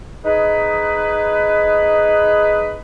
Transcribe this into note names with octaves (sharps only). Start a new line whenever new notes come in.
D#4 G#4 B4